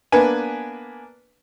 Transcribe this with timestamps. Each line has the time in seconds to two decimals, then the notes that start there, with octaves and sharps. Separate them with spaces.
0.12 A#3 B3 D4 B4 G#5